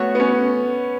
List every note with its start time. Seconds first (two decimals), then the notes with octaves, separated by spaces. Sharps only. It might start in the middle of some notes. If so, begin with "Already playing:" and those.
Already playing: A3 B3 F#4 C#5
0.15 B3
0.20 C#4